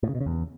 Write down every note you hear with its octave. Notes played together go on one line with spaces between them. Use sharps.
A2
C#3
B2
C#3
E2